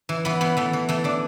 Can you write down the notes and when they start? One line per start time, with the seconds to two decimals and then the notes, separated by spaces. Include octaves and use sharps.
0.09 E3
0.25 E3 B3
0.41 E3 B3
0.57 E3 A3
0.73 E3
0.89 E3 A3
1.04 E3 D4